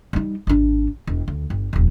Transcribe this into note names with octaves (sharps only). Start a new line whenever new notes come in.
G3 D#4
G#1 D4
E1
D2
G1
D#1 F2